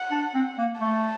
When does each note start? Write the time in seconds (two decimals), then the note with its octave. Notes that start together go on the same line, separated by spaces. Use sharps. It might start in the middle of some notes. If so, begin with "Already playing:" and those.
Already playing: F#5
0.11 D4
0.35 C4
0.58 A#3
0.81 A3 A5